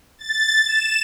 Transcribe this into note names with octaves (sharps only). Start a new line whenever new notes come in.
A6
E7